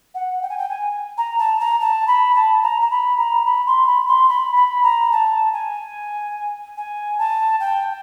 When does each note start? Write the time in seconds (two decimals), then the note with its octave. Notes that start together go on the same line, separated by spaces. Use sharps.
0.14 F#5
0.42 G5
0.50 G#5
0.58 G5
0.70 G#5
1.18 A#5
1.39 A5
1.60 A#5
1.80 A5
2.07 B5
2.35 A5
2.63 A#5
2.81 A#5
2.91 B5
3.18 A#5
3.46 B5
3.66 C6
3.87 B5
4.08 C6
4.29 B5
4.56 B5
4.83 A#5
5.12 A5
5.53 G#5
6.77 G#5
7.19 A5
7.60 G5